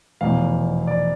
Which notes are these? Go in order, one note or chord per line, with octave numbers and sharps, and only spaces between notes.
F1 E2 B2 F5
D5